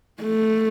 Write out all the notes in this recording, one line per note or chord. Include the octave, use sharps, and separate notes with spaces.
A3